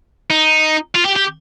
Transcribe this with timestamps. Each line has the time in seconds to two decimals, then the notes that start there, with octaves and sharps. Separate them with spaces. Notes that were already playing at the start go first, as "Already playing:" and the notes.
0.30 D#4
0.95 F4
1.06 G4
1.16 G4